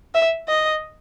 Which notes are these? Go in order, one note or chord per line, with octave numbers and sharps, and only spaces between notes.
E5
D#5